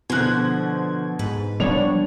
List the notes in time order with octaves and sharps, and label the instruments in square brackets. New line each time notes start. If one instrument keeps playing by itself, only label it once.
[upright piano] B2 F#6 [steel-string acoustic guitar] D3 F3 [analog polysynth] C5 G#6
[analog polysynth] G#2 [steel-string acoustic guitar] B4
[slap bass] F3 G3 B3 [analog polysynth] D4 C#5 [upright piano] F7